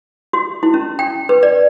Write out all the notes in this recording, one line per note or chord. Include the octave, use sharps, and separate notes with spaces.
F#4
E4
C#4
G5
B4
D5